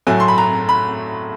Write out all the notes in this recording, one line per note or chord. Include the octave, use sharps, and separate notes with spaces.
A2 F#3 A3 G#5
C6
B5
A#5
B5